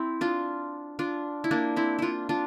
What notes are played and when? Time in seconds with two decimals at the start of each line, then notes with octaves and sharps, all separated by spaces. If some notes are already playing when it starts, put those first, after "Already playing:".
Already playing: C4 E4
0.21 D4 F4
0.99 D4 F4
1.44 E4
1.51 A#3 D4
1.76 C4 E4
1.99 D4 E4 F4
2.29 D4 F4